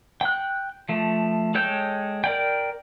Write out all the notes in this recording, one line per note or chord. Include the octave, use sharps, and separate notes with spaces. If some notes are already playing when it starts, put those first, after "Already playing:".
G5 F#6
F3 A3
G#3 A4 C#5 G5 G6
A#4 D5 G5